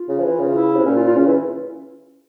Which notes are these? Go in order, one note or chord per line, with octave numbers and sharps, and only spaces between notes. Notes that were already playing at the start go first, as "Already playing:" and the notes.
Already playing: F4
C#3
F3
E3
C#3
E4
C3
A#2 C#4
F4
F4
C#3 C#4
E3 E4